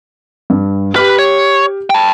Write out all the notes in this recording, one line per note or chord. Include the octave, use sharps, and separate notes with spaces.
G2
G4 B4 F6
C#5
G5 A5